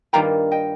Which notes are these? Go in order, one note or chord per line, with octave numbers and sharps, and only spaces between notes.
G2 D#3 G3 A#3 F4 G5 A#5
D#5 G5